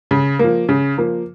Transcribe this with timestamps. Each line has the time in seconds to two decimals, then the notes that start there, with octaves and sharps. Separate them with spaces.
0.11 C#3
0.39 F3 A#3
0.69 C#3
0.98 F3 A#3